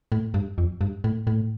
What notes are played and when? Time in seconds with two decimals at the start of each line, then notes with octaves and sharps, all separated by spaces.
0.12 A2
0.34 G2
0.58 F2
0.81 G2
1.04 A2
1.27 A2